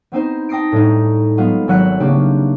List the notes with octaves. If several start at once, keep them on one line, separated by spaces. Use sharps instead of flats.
B3 C4 D#4 C5
G5 A5 D#6 A#6 C7 D7
A2 G3 D#4
F#3 G#3 B3 F4
G#1 F#3 E5 F#5 F#6 D#7
C#3 A#3 C4 D4 G4 G#4